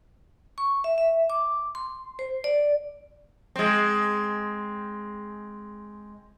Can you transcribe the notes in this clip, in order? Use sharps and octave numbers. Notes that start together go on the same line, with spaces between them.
C#6
E5
E5
D6
C6
C5
D5
G#3 C4